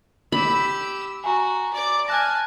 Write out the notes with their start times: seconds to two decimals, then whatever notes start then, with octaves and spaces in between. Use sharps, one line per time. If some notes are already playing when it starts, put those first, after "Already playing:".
0.32 G4 B5 E6
1.24 F#4 G#5 A#5
1.73 D5 D6
2.08 G#5 A5 F6 F#6 A#6